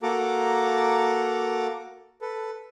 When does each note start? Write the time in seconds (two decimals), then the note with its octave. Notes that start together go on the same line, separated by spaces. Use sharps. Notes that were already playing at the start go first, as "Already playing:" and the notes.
0.03 A#3 F#4 A4 A#5 D6
2.21 A4 B4